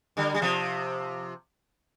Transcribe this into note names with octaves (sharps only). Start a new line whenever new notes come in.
D3 G3
G3
C3 F3